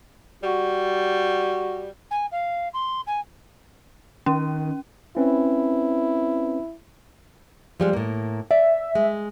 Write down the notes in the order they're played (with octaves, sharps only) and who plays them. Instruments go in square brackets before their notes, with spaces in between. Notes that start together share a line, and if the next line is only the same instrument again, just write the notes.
[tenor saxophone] G3 [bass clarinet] F#4
[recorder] G#5
F5
C6
G#5
[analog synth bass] D#3 [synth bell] C#4
[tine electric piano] C4 C#4 B4 [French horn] E4
[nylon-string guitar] F3 G3 G#3
A2 A#3
[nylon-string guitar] D5 [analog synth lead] E5
[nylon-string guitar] G#3